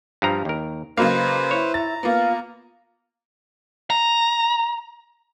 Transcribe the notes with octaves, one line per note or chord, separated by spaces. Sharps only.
G2 F3 A#5
D#2 A#4
C#3 F#3 A#3 B4 C5 D#5 F5
E4 C#5
A#5 A6
A#3 B3 F4
A#5